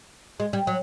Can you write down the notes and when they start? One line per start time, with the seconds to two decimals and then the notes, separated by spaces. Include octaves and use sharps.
0.40 G#3
0.53 G3
0.67 F#3